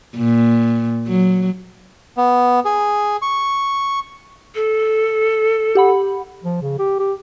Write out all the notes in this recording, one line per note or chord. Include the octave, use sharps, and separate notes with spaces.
A#2
F#3
B3
G#4
C#6
A4
G4 F#5 B5
F3
C#3
G4
G4